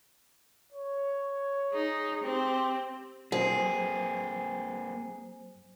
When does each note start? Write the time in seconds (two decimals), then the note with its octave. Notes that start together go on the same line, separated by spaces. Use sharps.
0.73 C#5
1.71 D#4 G#4
2.24 C4 G4
3.32 F#3 A#3 C4 G#4 C5